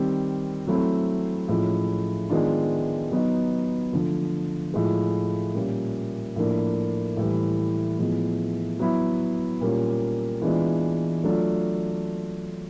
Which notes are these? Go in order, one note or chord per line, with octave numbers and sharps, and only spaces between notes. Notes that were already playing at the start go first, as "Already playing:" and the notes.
Already playing: D#3 G3 C4
F#3 A3 C4 E4
A2 F3 G#3 C#4 F4
D#3 G#3 B3 D4 F4
F#3 B3 D#4
D3 F3 A3
A2 F3 G#3
A#2 G3 A#3 C#4 F4
A2 F3 A#3 D4
A2 E3 G3
A2 F3 G#3 B3
F#3 B3 E4
A#2 G3 A#3 C#4 F4
E3 G#3 B3 D4 F4
F#3 A3 D4 F4